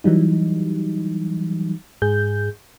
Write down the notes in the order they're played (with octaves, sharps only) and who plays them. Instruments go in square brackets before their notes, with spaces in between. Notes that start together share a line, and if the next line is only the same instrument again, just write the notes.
[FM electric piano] E3 F#3 G3 D#4
G#2 G#4 G6